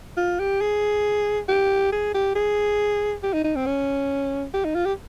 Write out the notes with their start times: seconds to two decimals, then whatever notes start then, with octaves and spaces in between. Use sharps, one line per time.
0.17 F4
0.40 G4
0.61 G#4
1.48 G4
1.92 G#4
2.14 G4
2.35 G#4
3.23 G4
3.33 D#4
3.44 D#4
3.56 C4
3.66 C#4
4.54 G4
4.65 D#4
4.75 F4
4.86 G4